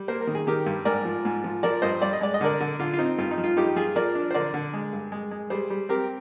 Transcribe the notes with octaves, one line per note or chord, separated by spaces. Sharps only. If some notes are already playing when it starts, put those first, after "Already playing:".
Already playing: G3
A#3 C5
A#4
D#3
G#4
D#3 G4 A#4
G2
G#2 A#4 D5
F3
G#2
F3
F3 A#4 D5
G2 C5 D#5
G2 D5
D#5
G#3 D5
D#5
D3 A#4 D5
D3
D3 F4
F4
C4 D#4
G2 F4
D#4
F3
F4
G2 D#4 G4
F3 F4 G#4
F3 A#4 D5
D4
C5
D3 A#4 D5
D3
G#3
G2
G#3
G#3
G3 G#4 C5
G3
C4 G4 A#4